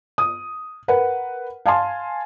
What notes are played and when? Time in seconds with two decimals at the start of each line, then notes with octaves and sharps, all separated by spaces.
0.18 D#6
0.88 A#4 B4 F#5
1.66 F5 G#5 A5 C6